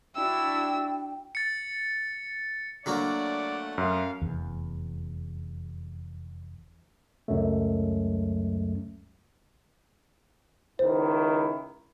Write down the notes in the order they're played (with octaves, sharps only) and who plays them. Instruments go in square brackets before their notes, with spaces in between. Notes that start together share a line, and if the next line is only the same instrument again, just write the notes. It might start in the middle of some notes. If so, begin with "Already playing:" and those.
[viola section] D4 E4 F#4 [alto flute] G5 [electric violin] E6
[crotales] A6 C#7
[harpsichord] D3 F#3 A#3 [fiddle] A3 F#5 [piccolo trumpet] D5
[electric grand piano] F#2 [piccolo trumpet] F5
[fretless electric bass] F1 E2
[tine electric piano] C#2 F#2 F#3 G#3 A3
[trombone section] C#2 D#3 E4 [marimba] C5